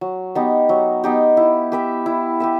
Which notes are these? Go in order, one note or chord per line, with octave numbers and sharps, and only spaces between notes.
F#3
B3 D#4 G4
F#3
B3 D#4 G4
E4
G4 B4 E5
E4
G4 B4 E5